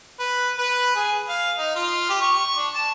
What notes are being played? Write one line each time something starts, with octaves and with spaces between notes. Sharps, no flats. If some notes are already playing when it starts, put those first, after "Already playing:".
B4
B4
G#4
F5
D#4
F4
G4
C#6
D4
A5